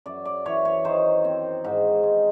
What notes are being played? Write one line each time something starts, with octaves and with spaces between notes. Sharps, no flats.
F#2 D5
D5
E3 C#5
C#5
D#3 C5
C4
G#2
G#3